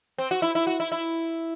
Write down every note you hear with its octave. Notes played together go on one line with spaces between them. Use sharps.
C4
F#4
E4
E4
F#4
E4
E4